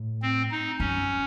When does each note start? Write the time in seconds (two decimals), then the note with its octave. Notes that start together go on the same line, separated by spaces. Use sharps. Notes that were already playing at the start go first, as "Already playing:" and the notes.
Already playing: A2
0.22 C4
0.51 D#4
0.79 F#2 C#4